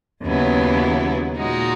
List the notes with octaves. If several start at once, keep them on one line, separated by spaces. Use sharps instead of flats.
D#2 C#3 F#3 B3 E4
A#2 G#3 D#4 F#4